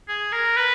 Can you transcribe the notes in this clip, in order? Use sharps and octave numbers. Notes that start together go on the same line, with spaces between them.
G#4
A#4
B4